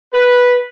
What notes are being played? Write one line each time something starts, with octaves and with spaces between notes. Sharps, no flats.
B4